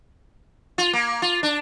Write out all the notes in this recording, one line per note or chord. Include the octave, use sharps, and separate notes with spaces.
F4
A#3
F4
D4